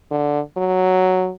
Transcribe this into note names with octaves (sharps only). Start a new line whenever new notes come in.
D3
F#3